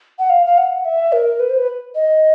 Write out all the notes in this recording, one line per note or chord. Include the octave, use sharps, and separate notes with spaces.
F#5
F5
F5
F#5
E5
A#4
B4
C5
B4
D#5